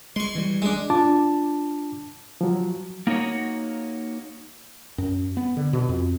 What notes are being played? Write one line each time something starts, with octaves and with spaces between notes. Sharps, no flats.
G#3 C6 C#6
E3 G3
G#3 D4
D4 F4 A5 D6
F3 F#3
A#3 D#4 F#4 C#5 F#5
F#2
B3
D3
B2
F2